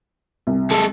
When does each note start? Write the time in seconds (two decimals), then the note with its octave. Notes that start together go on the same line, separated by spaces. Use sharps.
0.47 C2
0.71 G#3 A4